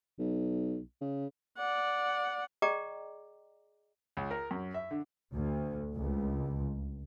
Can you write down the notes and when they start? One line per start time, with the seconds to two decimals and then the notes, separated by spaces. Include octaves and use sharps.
0.19 B1
1.01 C#3
1.57 D5 F#5
2.62 G#4 D5 D#5 G5 A#5 D6
4.17 C#2
4.31 A#4
4.51 F#2
4.74 E5
4.91 D3
5.32 D2
5.94 C#2